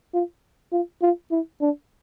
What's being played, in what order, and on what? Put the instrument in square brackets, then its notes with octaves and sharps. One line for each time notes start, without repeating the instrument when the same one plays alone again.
[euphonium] F4
F4
F4
E4
D4